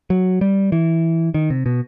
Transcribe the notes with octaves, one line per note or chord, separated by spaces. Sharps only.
F#3
G3
E3
D#3
C3
B2